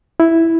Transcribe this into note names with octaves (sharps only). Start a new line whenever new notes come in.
E4